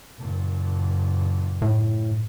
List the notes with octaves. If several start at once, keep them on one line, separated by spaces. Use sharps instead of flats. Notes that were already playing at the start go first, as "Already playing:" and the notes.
F#1 A#2
A2